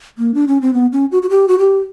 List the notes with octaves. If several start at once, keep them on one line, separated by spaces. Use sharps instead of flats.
A#3
D4
C#4
C4
B3
C#4
F#4
F#4
G4
F#4
G4